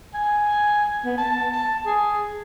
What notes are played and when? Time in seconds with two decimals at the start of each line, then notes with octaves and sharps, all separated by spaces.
0.14 G#5
1.05 B3
1.18 A5
1.53 A5
1.86 G#4